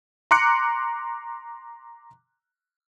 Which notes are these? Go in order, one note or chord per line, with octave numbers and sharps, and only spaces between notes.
A#5 C6 D6 F#6 C#7